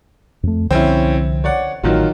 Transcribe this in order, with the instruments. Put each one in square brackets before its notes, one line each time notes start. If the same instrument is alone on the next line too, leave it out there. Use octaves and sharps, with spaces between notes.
[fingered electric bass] F2 A3
[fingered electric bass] C2 D3 F3 [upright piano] C4 C#4 E4
[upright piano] C#5 D5 F#5
[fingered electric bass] A1 [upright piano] D#3 F#3 F4